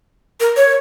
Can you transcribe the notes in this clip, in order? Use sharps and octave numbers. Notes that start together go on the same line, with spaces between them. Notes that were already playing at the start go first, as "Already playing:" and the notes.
A#4
C#5